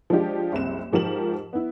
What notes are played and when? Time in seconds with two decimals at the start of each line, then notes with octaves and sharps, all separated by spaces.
0.10 F3 G#3 D4 F4 G4
0.52 F#1 C2 C4 E7
0.93 G#2 F3 G4 A#4 E7 F#7
1.53 B3 E4